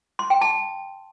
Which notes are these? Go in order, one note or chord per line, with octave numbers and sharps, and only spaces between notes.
C6
G5
A5